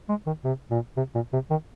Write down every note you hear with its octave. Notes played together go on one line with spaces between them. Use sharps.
G#3
D#3
C3
A#2
C3
A#2
C3
D#3